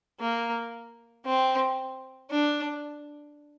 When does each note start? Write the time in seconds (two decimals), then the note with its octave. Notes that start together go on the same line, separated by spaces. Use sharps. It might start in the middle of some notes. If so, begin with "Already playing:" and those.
0.20 A#3
1.25 C4
2.31 D4